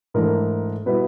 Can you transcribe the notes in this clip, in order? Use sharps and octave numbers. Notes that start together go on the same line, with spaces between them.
G#2 E3 A3 D4 A#4
B2 G3 B3 E4 B4